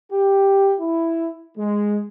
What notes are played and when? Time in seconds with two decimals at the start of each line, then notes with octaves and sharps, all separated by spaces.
0.11 G4
0.80 E4
1.57 G#3